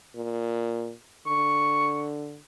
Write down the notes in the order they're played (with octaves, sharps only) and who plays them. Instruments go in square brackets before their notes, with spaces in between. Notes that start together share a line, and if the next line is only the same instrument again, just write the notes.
[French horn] A#2
[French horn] D3 [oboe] C#6